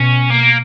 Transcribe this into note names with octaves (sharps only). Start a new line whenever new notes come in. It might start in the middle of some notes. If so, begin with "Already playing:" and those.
Already playing: B2 C#4
A#3